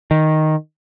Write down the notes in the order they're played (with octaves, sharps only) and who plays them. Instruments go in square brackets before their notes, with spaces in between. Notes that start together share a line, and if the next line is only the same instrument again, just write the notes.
[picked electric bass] D#3